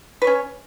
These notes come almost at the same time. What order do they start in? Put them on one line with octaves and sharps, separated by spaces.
B4 C#5 C#4